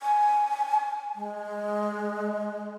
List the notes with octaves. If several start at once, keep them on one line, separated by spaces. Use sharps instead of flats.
G#5
G#3